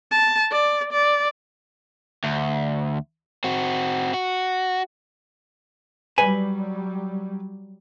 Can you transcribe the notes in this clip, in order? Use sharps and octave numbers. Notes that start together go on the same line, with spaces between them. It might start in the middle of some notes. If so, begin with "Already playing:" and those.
A5
D5
D5
D2
C4 F#4
F#4
F#3 G3 B4 G#5